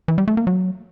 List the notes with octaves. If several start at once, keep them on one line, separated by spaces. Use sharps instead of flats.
E3
G3
A3
A#3
F#3